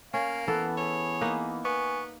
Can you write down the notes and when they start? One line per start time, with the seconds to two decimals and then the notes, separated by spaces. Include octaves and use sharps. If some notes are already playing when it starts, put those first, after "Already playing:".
0.14 A#3 C#4 F5
0.48 E3 B3 A4 F#5
0.78 G#4 C#5
1.21 A#3 D#4 B4
1.65 B3 G#5 C#6